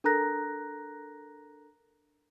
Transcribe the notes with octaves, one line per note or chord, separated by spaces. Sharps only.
D4 A4 A#4 A#5 F#6 A#6